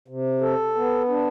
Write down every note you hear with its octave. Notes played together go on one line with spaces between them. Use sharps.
C3
A4
B3
D4